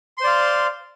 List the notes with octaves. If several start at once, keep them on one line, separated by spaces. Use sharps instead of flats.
C5 D5 F5 C6